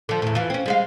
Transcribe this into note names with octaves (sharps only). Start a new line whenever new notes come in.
D3 F3
E2 A2
E3 F4
C4 C#4
G3 G#3 F5